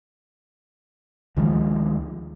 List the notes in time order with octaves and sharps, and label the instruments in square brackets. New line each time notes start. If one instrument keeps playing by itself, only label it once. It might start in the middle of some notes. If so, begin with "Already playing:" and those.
[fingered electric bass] D2 D#3 F3 G#3